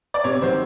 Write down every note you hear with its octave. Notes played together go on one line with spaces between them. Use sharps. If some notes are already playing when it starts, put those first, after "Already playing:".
D5
C3 C#5
D#3 F#3 C5